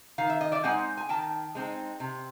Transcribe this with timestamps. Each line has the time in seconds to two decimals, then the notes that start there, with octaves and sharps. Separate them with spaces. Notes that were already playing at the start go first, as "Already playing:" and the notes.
0.18 D#3 F5
0.30 E5
0.41 D#5
0.52 D5 E5
0.64 G#3 C4 D#4 F#5 G#5
0.97 G#5
1.09 D#3 G5 A5
1.55 G#3 C4 D#4
2.00 C3